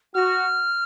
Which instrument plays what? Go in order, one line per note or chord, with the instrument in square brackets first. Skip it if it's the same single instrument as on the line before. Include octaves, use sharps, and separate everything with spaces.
[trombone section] F#4 [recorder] F6